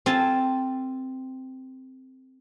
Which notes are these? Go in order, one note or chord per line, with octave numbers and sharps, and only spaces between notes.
C4 F4 A4 G#5 A5